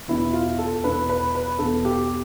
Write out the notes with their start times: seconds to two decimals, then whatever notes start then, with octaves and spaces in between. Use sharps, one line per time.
0.08 E2 B2 E4
0.33 F4
0.59 A4
0.84 E2 B2 B4
1.09 B4
1.35 B4
1.59 E2 B2 A4
1.85 G4